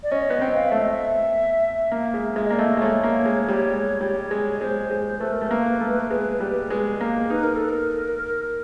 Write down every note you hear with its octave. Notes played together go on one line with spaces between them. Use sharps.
D5
C#4 D#5
B3
C4
F5
A3 E5
D#5
E5
A#3
G#3
G#3 E5
D#5
A#3 D5
A3 D#5
G#3
A3 C#5
A#3
G#3
G3
G#3
G3
G#3
G#3 C5
G#3
C5
A3 B4
A#4
A3
A#3 B4
A3
G#3
G3
G#3
A#3
D#4 B4
A#4
A4
A#4